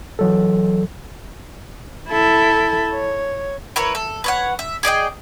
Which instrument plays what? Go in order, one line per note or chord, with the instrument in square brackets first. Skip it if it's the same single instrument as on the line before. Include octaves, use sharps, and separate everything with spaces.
[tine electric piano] E3 F#3 A4
[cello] E4 A4
C#5
[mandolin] E4 A#4 B4 C#5
A4
B4 C#5 F#5
E5
G#4 D5 D#5 G5